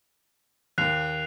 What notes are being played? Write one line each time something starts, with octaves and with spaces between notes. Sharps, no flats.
D#2 F#6 C7 F7